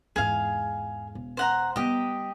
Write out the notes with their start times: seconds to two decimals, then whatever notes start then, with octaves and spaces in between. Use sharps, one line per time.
0.16 E2 G#2 G#4 F5
1.15 E1
1.37 C5 F#5 A#5
1.76 G3 B3 G4 D#5